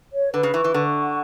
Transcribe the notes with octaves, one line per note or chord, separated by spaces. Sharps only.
C#5
D3 B4
C#3
E3 C#6
E3
D3 C#6
F#5